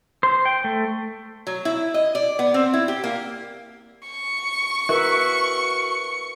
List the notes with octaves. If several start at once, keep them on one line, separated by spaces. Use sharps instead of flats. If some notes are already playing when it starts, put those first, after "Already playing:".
C5
G5
A3
F#3
E4
D#5
D5
B3
C4
E4
G4
A#3
C#6
F#4 A#4 B4 E5